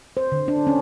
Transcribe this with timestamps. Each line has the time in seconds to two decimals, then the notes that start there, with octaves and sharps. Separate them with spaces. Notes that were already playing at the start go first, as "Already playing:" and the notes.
0.17 C5
0.32 D3
0.48 D4
0.67 C#4